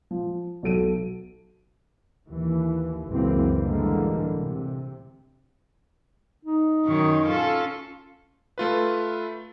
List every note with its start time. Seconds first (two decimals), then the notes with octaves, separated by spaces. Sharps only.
0.11 F3
0.63 B1 F#3 A4 D7 D#7
2.29 D#2 E3
3.08 F#1 C#2 F#2 E3 A#3 C4
3.58 A2 D3 E3 G3 G#3 A#3
4.35 C3
6.45 D#4
6.86 F#2 D#3 C#5
7.24 C#4 F4 A4
8.58 A3 F4 B4